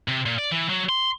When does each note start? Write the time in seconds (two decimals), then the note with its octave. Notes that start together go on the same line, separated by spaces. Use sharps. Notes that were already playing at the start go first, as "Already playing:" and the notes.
0.08 C3
0.26 A#2
0.39 D5
0.52 E3
0.69 F#3
0.89 C6